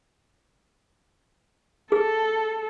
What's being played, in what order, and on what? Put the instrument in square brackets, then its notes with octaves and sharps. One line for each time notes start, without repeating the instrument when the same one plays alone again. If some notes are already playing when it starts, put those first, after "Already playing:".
[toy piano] G#4 [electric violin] A4